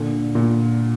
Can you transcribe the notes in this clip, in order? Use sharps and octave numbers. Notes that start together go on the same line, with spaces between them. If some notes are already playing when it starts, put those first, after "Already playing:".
Already playing: A#2 D3
A#2